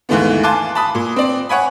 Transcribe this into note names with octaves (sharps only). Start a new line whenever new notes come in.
D#2 G#2 E3 A3 B3
F5 G#5 A5 C6 D6 F#6
A5 B5 D#6
A#2
C4 D5
C#5 F#5 G#5 B5